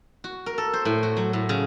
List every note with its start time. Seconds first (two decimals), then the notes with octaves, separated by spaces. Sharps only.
0.24 F#4
0.46 A#4
0.58 A4
0.73 C5
0.85 A2
1.03 F#4
1.17 F#3
1.33 A2
1.49 C#3